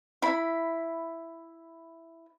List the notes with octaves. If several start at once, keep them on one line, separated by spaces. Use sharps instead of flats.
E4 B5